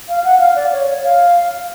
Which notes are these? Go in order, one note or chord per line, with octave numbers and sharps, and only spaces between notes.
F5
F#5
F5
D5
C#5
F5